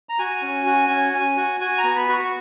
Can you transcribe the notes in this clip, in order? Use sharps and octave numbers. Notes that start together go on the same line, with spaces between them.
A#5
F#4 G#5
C#4
F#4
C#4
C#4
F#4
F#4 G#5
A#5
B3
B5
F#4 C#6